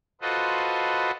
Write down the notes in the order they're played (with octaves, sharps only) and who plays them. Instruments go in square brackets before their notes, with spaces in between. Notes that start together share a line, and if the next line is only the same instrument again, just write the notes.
[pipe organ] F4 F#4 A4 B4 C5 D#5